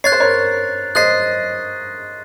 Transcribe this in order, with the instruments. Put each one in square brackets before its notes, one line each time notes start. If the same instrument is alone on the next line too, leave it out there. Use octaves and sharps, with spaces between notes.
[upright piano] C#5 [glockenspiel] F#6 A6 C7
[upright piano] C5
A#4 C#5
[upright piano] C5 D#5 [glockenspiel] F#6 A6 C7